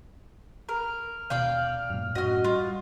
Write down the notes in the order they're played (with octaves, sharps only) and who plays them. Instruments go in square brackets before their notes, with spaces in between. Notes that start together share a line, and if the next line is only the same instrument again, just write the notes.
[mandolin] A#4 [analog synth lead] F6
[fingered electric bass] D#1 B2 [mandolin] D5 F5 G5
[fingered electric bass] F#2 A#2
[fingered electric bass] F#2 A2 C#4 [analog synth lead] F#4 [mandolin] D#5 F6
[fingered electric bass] G3 [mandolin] F4